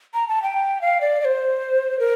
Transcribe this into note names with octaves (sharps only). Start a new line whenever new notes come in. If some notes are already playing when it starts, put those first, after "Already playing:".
A#5
A5
G5
F5
D5
D5
C5
A#4